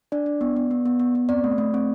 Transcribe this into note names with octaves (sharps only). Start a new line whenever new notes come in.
D4 D5
D4
B3
B3
B3
B3
B3
B3
C4 D5
A3
A3
C4